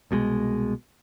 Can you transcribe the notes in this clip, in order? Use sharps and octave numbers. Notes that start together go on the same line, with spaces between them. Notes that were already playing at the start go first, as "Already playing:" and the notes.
C2 B2 F#3 G#3